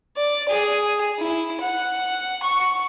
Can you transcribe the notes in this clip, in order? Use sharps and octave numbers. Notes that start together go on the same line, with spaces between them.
D5
G#4
E4
F#5
C#6